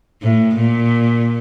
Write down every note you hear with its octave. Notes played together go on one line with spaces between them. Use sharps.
A2
A#2